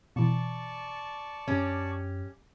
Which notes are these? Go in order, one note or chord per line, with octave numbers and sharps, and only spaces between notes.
B2 E3 D5 A5 C#6
F#2 C#4 G4